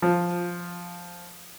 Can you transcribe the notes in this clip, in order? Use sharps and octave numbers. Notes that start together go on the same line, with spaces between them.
F3